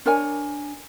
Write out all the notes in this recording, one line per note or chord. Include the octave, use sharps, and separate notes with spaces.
D4 A#4 C#5 G#5